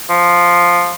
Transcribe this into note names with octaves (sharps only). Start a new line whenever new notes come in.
F3